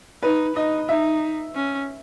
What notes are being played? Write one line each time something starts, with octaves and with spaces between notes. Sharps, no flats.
D#4 B4
D#4 D#5
D#4 E5
C#4